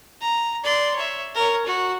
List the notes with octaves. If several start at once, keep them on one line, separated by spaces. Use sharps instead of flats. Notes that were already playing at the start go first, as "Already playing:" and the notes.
A#5
D5 C6
C#5 E5
A#4 C#5
F#4